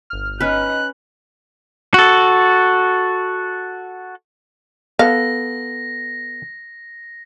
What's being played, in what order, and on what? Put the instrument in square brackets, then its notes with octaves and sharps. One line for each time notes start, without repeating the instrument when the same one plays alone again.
[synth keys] G1 F6
[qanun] C#4 B4 [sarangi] D#4 [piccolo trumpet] F#6
[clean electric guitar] F#4 A4
[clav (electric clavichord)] B3 A4 [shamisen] F5 [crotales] A#6